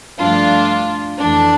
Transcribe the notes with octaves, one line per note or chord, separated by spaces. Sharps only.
G2 F3 A3 D4 F4
F2 E3 A3 D4